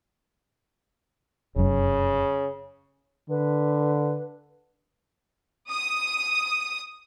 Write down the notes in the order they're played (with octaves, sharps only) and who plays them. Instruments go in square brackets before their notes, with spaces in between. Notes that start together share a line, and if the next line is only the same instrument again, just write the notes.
[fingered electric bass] F1 F#2 [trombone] C#3
[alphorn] D3 [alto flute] B4
[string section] D#6